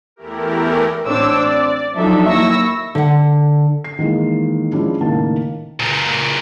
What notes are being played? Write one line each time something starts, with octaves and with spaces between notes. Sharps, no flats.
E2 E3 A3 E4 G4 A#4
A1 C4 D4 C#5 D6 E6
D5
F3 F#3 D4 D#4 A4 E5
D#2 E4 C#6 E6 A#6
D3 F#5
C7
D#3 E3 G#3 A#3
F3 G#3 C#4 D4 E4
C#2 A2 D#3 A#3 A5
C#2 A#2